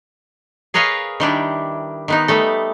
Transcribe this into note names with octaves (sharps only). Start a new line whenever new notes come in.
G#4 A#4 B4 C#5 D#5 F5
D#3 G3 D4 E4
D#3 B3 D#4
G3 A3 A4